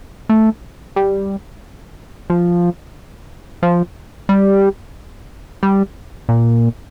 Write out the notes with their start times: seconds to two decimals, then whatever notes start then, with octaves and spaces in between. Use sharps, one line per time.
0.29 A3
0.96 G3
2.30 F3
3.63 F3
4.29 G3
5.63 G3
6.29 A#2